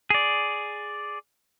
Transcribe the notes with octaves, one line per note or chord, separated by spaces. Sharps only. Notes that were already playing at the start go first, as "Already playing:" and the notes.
G#4 D5